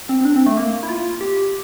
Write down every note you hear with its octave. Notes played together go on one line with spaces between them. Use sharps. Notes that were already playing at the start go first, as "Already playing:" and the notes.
C4
C4
D4
C4
A3
A#3
E4
F4
G4